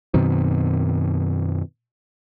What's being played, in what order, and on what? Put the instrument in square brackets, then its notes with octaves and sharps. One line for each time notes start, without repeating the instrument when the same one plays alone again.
[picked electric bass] F#2 B2 D#3 C4